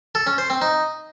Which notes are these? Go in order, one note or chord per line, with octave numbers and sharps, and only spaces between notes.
A4
C#4
C5
C4
D#4